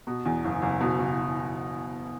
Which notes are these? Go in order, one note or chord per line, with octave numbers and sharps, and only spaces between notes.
B2
E2
F#1
F#1
B2
F#1